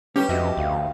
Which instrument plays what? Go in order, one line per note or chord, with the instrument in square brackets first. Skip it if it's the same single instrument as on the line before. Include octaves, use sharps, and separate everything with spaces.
[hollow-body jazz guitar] G3 A#3 C#4 [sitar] G4 [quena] B4
[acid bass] F2 [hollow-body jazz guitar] F#4 D#5 E5
[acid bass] D2 [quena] F5